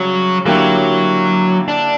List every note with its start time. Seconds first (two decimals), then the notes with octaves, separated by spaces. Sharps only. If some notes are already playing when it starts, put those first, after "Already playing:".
Already playing: C#3 F#3 G3
0.45 D3 F#3 A#3 E4 G4
1.68 D4